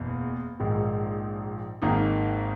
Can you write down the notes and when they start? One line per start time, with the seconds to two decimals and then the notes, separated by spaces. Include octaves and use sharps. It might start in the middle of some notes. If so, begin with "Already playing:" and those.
Already playing: F#1 E2 B2
0.59 A#1 G#2 D#3 G#3
1.82 G#1 G#2 D#3 A#3 D#4